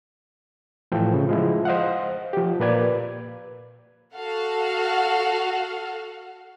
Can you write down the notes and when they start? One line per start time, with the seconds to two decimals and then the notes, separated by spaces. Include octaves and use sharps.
0.92 A2 E3 F3 A4 G5
1.13 C#3
1.29 F3 G#3 E4
1.65 C5 D#5 F5 F#5
2.33 F3 G4
2.60 A#2 A#3 B4 D5 G#6
4.14 F#4 A4 F5 F#5